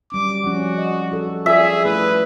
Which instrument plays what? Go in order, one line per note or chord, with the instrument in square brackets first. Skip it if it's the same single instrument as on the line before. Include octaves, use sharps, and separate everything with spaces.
[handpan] F#3 G3 C#4 [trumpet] D6
[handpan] F3 C#4 [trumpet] F#4
[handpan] D#5
F#4 A4
[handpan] F4 D5 [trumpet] G#4 [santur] E5
[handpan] A3 E4 [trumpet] B4